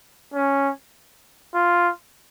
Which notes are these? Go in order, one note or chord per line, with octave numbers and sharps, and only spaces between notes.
C#4
F4